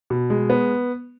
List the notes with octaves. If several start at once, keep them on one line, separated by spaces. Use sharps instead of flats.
B2
G#3
B3